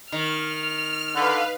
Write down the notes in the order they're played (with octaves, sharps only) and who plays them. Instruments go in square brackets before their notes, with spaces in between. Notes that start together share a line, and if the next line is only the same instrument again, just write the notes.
[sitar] D#3 [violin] F6
[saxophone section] D3 [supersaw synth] B4 F5